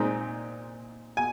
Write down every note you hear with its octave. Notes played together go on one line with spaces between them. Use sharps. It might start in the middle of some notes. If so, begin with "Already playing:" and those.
Already playing: A#2 G#3 C4 D#4
G#5